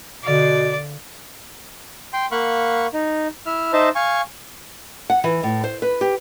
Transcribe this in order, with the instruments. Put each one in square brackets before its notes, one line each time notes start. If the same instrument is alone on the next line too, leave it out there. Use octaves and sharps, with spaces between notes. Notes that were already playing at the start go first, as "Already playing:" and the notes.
[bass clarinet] B2 [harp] D3 F5 C7 [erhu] D5
[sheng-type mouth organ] G5 C6
A#3 F5 F#5 B5 C#6
D#4
E4 E5 F6
D#4 C5 D#5 E5 A5
F5 G#5 C#6
[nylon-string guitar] F#5
E3
A2
C5
B4
G4